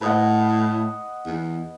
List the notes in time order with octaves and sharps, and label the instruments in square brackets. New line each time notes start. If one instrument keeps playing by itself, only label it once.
[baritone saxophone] A2 [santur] B4 D#5 F#5
[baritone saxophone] E2